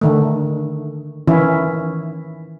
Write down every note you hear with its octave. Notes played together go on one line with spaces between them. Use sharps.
D3 D#3 A3
D#3 E3 C#4 E4